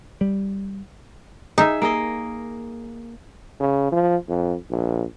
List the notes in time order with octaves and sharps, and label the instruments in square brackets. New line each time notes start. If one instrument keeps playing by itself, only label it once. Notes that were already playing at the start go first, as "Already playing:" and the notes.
[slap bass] G3
[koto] D#4 [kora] G#4 E5
[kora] A#3 G#4 D#5
[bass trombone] C#3
F3
F2
A#1